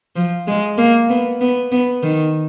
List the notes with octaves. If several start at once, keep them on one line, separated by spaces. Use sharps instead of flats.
F3
G#3
A#3
B3
B3
B3
D#3